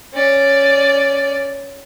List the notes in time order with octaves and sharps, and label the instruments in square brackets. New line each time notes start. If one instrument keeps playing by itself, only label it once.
[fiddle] C#4 D5